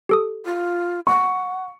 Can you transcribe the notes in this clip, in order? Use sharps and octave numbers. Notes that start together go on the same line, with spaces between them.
G4 A4 D#6
F4
F#5 C#6